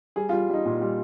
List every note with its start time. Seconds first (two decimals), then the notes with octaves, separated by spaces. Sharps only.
0.16 G3 G#4
0.29 F4
0.33 G3
0.49 G3 D#4
0.65 A#2
0.81 G3